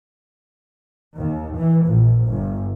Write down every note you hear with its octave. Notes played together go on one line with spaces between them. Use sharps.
D#2
E3
A#1
G1